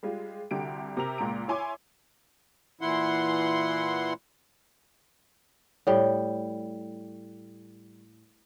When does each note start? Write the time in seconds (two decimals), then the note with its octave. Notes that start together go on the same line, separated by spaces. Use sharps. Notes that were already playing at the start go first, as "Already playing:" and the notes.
0.03 G3 G#3 F4
0.51 C2 D3 F#4 G4 D7
0.97 C3 A#4 F7
1.18 C#2 A#2 A#3 A#5 D7
1.48 E4 C#5 G#5 C6 D6
2.81 A#2 E3 E4 F#5 C6
5.87 A2 G3